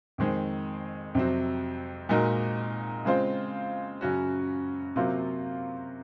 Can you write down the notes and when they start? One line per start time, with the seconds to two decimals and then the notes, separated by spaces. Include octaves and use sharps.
0.18 F2 D#3 G#3 C4
1.15 F2 C3 F#3 C4
2.09 A#2 G#3 D#4 F#4 A#4
3.05 C#3 G#3 C4 F4 C5
4.01 F#2 C#3 F#3 C#4 F#4
4.96 C3 F#3 A#3 F4 C5